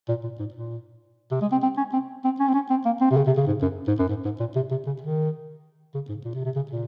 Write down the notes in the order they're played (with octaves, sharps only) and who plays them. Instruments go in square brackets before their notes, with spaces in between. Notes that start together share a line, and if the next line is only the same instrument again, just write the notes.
[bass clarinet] A#2
A#2
G#2
A#2
C3
G#3
C4
C4
C#4
C4
C4
C#4
C4
C#4
C4
A#3
C4
C3
C#3
C3
C#3
G#2
F#2
G#2
F#2
G#2
G#2
A#2
C3
C3
C#3
D#3
C#3
G#2
A#2
C3
C3
C#3
A#2